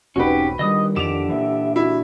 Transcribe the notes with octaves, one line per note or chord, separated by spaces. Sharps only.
E1 B1 C4 C#4 D#4 F#4 G4 B4
D3 D#3 G3 D#5 D#6
F2 D3 E3 G4 D6 E7 F7
A#2 E3 E5
E4 F#4